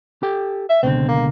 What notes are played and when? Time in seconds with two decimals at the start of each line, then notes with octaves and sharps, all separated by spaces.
0.23 G4 A4 G5
0.69 E5
0.83 C#2 B2 D3 C4
1.08 A#3